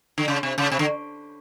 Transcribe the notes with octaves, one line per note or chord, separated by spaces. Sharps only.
D3
C#3
C3
C#3
C3
D3